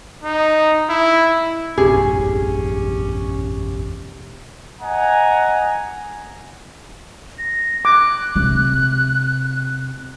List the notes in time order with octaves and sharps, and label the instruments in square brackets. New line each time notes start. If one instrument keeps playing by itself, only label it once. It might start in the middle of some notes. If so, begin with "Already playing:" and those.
[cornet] D#4
E4
[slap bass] E1 A1 F#2 [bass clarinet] C#4 [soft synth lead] G4 [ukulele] G#4
[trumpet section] D#5 F#5 G#5 A#5
[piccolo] A#6
[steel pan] D6 [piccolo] F#6
[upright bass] C3